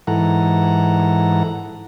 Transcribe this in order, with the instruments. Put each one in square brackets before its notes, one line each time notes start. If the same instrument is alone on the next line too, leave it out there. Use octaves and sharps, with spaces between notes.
[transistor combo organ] G#2 E3 A4 F#5 A#5